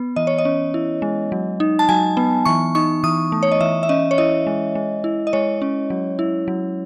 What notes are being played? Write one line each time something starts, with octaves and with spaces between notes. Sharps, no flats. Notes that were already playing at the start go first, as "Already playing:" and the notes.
Already playing: B3
E3 D#5
C#5
D#5
C#4
E4
G#3
F#3
D#4
A5
F#3 G#5
B3
E3 C#6
D#4 C#6
E3 D#6
A3
C#5
D#5
E3 E5
E5
C#4 D#5
C#5
E4 D#5
G#3
G#3
E4
D#5
G#3 C#5
C#4
F#3
E4
F#3